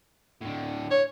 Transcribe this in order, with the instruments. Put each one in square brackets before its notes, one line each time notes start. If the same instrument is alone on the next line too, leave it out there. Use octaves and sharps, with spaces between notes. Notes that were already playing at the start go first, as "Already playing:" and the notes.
[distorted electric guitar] A2 D3
[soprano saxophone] C#5